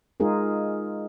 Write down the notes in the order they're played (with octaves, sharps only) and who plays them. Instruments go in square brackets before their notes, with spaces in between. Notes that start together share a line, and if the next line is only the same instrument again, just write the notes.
[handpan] G#3 D#4 F4 G#4 A#4